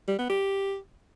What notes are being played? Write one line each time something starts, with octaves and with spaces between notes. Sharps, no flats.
G3
B3
G4